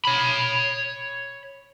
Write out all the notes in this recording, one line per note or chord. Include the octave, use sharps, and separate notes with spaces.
C#5 B5